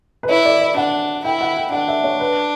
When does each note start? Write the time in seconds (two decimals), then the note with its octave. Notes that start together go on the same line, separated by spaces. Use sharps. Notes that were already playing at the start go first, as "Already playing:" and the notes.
0.23 B4
0.29 E4 C#5
0.45 D5
0.61 D5
0.76 D4 F#5
1.24 E4 G5
1.41 F#5
1.57 G5
1.72 D4 F#5
1.88 E5
2.04 C#5
2.20 B4